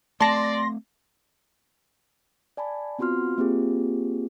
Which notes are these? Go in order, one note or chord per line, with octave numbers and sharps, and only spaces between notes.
A3 C4 D5 A5 C6 A#6
D5 G#5 A5 B5
B3 C4 F4 F#4 C6 F6
A#3 C4 F4 G4 G#4